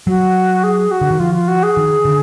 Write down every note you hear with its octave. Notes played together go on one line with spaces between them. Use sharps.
F#3 F#4
G#4
F#4
D3
D#3
F3 F4
F4
F#4
G#4
D#3
D3